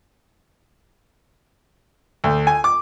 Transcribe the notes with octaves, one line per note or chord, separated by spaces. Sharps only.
D2
G#5
D6